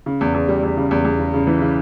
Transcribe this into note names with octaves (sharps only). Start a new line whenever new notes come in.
C#3
E2
E2
G3
E2
C#3
E2
E2
C#3
C#3
E3
C#3